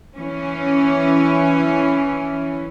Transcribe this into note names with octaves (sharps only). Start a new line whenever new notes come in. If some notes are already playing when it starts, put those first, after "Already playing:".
E3 C#4